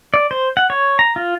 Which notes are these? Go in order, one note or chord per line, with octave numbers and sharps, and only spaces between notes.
D5
C5
F#5
C#5
A#5
F4